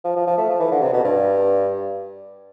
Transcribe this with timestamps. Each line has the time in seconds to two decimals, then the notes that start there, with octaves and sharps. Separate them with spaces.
0.05 F3
0.16 F3
0.27 F3
0.38 A3
0.49 F3
0.60 E3
0.72 D3
0.82 C3
0.93 B2
1.05 G2